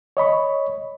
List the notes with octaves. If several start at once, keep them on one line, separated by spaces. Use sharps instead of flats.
C#5 D#5 B5 C#6